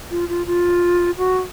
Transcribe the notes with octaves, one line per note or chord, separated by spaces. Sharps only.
F4
F4
F4
F#4